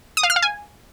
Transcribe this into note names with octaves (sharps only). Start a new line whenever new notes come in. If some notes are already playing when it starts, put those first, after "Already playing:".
D#6
F5
F6
F5
G#5